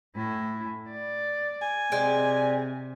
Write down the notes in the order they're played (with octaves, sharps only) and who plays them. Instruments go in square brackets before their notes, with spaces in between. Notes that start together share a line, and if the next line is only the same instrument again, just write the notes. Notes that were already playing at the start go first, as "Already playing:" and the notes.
[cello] A2 E4
D5
[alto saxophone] G#5
[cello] C3 [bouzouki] G#3 D5 G5